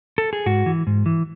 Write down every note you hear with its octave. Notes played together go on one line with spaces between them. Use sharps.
A4
G#4
G#2 F#4
E3
G#2
E3